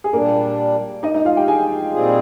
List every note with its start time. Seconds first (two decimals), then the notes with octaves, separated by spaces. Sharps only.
0.04 G#4
0.13 A#2 G3 A#3 D4 A#4
1.03 D#4 D#5
1.14 D#4 D#5
1.25 F4 F5
1.36 G4 G5
1.48 G#4 G#5
1.92 A#2 G3 C4 F4 G#4